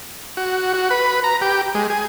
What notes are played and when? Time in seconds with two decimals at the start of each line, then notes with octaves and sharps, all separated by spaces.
0.37 F#4
0.74 F#4
0.90 B4
1.24 A#5
1.41 G4
1.75 G#3
1.90 G#4